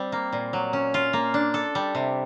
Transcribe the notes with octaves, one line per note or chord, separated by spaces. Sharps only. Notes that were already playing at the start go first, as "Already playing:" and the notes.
Already playing: G3 C4
A#3
A#2
F#3
C#4
F4
A#3
D4
A4
G3
C3